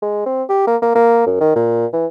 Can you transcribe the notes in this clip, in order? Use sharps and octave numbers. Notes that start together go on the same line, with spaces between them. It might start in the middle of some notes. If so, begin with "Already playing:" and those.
G#3
C4
G4
A#3
A#3
A#3
F#2
D#3
A#2
E3